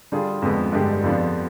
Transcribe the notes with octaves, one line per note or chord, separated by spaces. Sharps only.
D3 G3 D4 F4 G#4
F2 D3 G#3 B3
G2 D3 G#3 D4 G4
F2 D3 F3 B3 D4